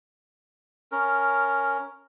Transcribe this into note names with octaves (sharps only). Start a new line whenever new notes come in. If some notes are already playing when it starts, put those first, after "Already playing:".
C#4 A#4